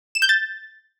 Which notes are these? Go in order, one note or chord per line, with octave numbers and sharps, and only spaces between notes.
E7
G6
A6